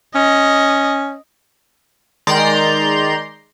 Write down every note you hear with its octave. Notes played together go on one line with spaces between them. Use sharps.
C#4 D#5
D#3 G#3 D5 A#5 C6 G6